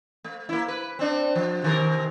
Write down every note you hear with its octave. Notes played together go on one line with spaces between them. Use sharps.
A3
A#3 E4
B4
C4 D4
F3
C3 D#3 A#4